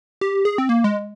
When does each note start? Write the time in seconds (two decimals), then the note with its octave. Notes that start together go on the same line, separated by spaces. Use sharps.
0.21 G4
0.45 G#4
0.58 C4
0.69 A#3
0.84 G#3